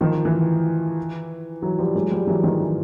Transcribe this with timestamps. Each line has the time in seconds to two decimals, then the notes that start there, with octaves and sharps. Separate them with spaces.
0.01 D#3 F3
0.25 E3
1.62 E3 F#3
1.79 F3 G3
1.95 F#3 G#3
2.11 F3 G3
2.27 E3 F#3
2.43 D#3 F3
2.60 E3